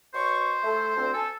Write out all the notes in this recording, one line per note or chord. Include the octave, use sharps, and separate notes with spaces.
B2 C5 C#5 C#6
A3 A4
D2 C4
A4 G#5 A5